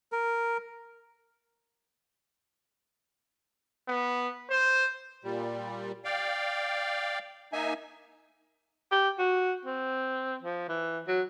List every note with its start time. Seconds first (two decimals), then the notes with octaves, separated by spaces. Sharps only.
0.12 A#4
3.88 B3
4.50 C5
5.24 A#2 G3
6.05 D5 F5 G5
7.53 A#3 D#4 E5 G#5
8.92 G4
9.19 F#4
9.65 C4
10.43 F3
10.69 E3
11.08 F#3